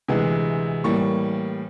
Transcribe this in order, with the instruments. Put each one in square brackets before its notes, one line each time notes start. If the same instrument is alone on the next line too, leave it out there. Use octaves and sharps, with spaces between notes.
[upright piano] D2 C3 E3 G#3
A2 E3 G3 A#3 C#6